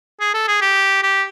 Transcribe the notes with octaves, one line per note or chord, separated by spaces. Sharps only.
G#4
A4
G#4
G4
G4